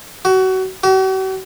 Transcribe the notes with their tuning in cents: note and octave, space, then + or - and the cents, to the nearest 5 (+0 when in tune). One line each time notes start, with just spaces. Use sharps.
F#4 +25
F#4 +45